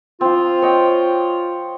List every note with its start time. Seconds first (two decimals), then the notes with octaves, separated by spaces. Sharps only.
0.21 F3 C4 F4
0.62 C#5 D#5 G5